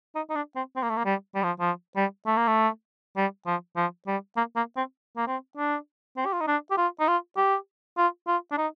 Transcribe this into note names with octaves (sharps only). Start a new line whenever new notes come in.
D#4
D#4
D4
C4
C4
A#3
A3
A#3
G3
G3
F3
F3
G3
A3
A#3
A3
G3
F3
F3
G3
A#3
A#3
C4
A#3
C4
D4
C4
G4
F4
D#4
D4
G4
F4
D#4
F4
G4
F4
F4
D4
D#4